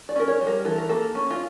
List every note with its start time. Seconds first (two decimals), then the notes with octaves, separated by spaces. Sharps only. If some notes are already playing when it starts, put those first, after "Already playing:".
0.09 D5
0.16 C#4 A#4
0.28 C#5
0.41 G3
0.47 A#4
0.65 E3 A4
0.78 A#4
0.89 A#3 A4
1.15 C#4
1.31 F4